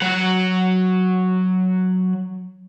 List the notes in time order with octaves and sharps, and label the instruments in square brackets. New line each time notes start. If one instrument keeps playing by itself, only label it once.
[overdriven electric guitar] F#3 F#5